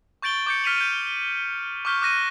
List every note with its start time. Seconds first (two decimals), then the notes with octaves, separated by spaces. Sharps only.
0.22 C#6 G6 A6 D7 F#7 G7
0.47 D6 G6 C#7
0.64 F6 B6 C#7 D#7 F7 F#7
0.76 G6 D#7
1.85 C#6 D6 F6 G6 B6
2.02 D6 F#6 A#6 D#7